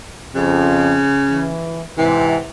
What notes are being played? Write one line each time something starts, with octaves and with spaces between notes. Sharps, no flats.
F2 C#3
E3
G#2 C3 E3